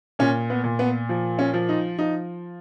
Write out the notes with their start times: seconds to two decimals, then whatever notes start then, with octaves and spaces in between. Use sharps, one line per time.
0.19 A#2 C#4
0.50 B3
0.64 A#2
0.79 B3
1.09 F3
1.39 C#4
1.54 F3
1.69 D#4
1.98 F3 D#4